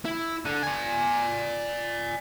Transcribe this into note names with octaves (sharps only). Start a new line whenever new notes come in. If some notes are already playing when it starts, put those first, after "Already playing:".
E4
D3
D5 G#5